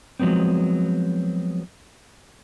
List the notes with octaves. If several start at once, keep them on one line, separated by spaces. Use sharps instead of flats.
F3 F#3 G#3 B3 C4